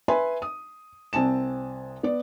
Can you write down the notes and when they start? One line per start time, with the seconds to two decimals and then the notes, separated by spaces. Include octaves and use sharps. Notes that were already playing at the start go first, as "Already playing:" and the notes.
0.08 B4 E5 G#5 B5 C6
0.42 D#6
1.13 C2 C4 G#5 A5 E7
2.03 B3 D5